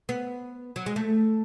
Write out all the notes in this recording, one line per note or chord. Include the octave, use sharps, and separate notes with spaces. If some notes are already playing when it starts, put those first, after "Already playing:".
B3
F#3
G#3
A3